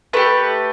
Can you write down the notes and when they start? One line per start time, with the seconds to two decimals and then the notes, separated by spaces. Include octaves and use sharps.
0.13 A3 G4 B4